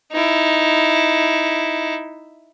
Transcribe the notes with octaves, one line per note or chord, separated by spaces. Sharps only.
D#4 E4